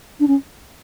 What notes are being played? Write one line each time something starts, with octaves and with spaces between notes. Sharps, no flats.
D4
C#4